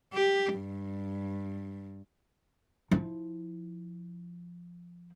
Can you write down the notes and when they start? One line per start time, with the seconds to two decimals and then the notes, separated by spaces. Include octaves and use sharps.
0.14 G4
0.56 G2
2.91 F3 E4